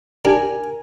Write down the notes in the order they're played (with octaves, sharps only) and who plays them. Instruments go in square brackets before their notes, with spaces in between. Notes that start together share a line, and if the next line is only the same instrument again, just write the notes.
[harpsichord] D4 G4 [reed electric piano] A#4 G#5